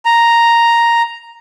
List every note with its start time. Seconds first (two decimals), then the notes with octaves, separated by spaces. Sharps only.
0.05 A#5